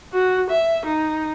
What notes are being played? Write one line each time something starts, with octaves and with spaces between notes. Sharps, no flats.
F#4
E5
D#4